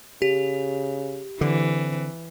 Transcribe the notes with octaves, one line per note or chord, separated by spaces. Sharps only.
C#3 G4
D3 E3 C4